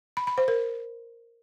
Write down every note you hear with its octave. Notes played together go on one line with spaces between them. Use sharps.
B5
B5
C5
A#4